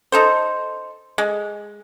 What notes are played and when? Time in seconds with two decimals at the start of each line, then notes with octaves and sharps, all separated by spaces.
0.12 D#4 A4 C5
1.18 G#3